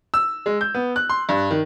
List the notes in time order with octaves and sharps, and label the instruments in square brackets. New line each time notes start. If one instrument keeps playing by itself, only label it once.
[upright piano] E6
G#3
G6
B3
F#6
C6
G2
D#3